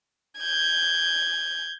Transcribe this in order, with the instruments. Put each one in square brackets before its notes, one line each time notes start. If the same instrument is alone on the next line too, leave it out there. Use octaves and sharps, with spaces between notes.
[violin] G6 G#6